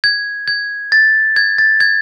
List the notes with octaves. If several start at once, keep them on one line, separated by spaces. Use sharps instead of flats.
G#6
G#6
A6
G#6
A6
G#6